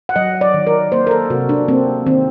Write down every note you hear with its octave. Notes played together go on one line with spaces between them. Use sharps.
F#5
F#3 D#5
D5
D#3
A#4
A#3 C5
A#4
A4
C3 F#4
D4
A#3 C4
D#3 C4